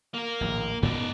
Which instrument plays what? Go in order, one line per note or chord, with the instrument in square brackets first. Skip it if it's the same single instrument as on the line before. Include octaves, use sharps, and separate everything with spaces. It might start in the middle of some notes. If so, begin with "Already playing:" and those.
[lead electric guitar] A#3 A#4
[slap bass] A#1 D#2 A2
[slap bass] G#2 B3 [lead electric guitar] D#4 D5